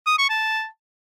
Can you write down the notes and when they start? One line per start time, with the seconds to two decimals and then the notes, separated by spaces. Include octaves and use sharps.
0.06 D#6
0.18 C#6
0.30 A5